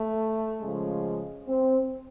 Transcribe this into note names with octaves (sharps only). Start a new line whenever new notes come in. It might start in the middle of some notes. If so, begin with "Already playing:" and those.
Already playing: A3
C#3 F3 G#3
C4